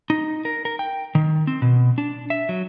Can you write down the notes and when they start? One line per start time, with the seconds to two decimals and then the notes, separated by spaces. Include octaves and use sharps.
0.10 D#4
0.45 A#4
0.65 A#4
0.79 G5
1.15 D#3
1.47 C4
1.62 B2
1.98 D4
2.30 E5
2.49 F#3